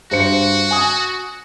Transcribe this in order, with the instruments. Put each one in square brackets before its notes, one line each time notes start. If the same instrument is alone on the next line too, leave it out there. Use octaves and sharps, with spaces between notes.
[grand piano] G2 C5 C#7 [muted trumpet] F#4
[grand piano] G#5 D#6